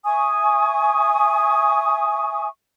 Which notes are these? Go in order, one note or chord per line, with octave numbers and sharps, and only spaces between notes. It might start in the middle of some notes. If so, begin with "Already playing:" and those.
E5 G#5 C#6 D#6